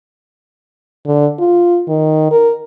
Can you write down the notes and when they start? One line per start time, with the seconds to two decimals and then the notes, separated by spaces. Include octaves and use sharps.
1.06 D3
1.39 F4
1.88 D#3
2.31 A#4